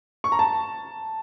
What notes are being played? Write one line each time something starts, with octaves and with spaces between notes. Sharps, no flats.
C#6
A#5
A5